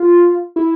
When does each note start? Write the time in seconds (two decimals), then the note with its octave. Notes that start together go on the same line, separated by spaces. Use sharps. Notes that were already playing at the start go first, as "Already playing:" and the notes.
Already playing: F4
0.56 E4